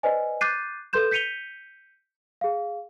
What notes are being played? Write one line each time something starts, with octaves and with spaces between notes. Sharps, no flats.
B4 C5 D5 D#5 G#5
D6 F#6 G6 A6 C7 D#7
A4 B4 C6 G6 E7
G6 B6 C#7 D#7 F7 G7
G#4 F5